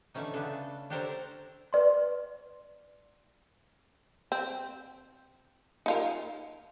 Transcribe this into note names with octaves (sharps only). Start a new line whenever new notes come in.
D3 E3 A3 C#4 D#4
C#3 B3 D4 A4
D4 G4 A4 A#4 C5 C#5
B4 D5 C6
C4
D#4 F4 A#4